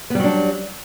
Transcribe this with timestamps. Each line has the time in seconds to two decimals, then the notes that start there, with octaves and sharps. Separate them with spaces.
0.10 B3
0.15 G3
0.19 F#3
0.24 D4